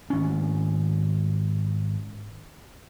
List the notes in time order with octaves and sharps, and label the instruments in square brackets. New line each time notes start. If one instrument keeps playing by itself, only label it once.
[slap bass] G#1 C#4